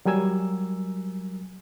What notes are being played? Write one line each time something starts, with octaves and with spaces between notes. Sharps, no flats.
F#3 G3 A#4 G#5 E6 G#6